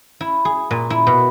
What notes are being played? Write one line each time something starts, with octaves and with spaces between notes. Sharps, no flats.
E4
G#4
A#2
E4
B2